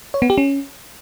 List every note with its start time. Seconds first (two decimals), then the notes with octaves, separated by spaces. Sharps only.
0.14 C#5
0.22 B3
0.30 G4
0.38 C#4